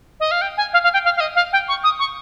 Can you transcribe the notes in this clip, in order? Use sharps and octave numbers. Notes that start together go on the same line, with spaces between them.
D#5
F5
G5
G#5
F5
F5
G5
F5
F5
D#5
F5
G5
C#6
D#6
C#6